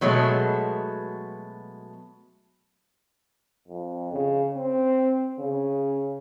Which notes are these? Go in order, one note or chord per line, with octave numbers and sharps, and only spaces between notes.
B2 F#3 G#3 A3
F2
C#3
C4
C#3